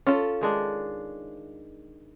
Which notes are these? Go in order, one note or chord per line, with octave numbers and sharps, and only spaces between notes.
C#4 F4 A4
D#3 G#3 D4